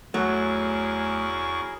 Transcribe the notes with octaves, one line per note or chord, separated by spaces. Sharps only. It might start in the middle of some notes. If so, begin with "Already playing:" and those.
E2 F#3 A3 E4 G#4 A#4 C#6